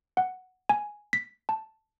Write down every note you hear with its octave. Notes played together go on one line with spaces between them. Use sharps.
F#5
G#5
B6
A5